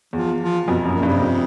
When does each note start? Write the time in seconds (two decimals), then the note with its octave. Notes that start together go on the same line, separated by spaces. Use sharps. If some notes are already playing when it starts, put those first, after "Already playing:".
0.13 E2 F3
0.41 F3
0.67 F2 B2
0.85 F#2
0.95 A#2
1.03 G2 C3
1.21 F2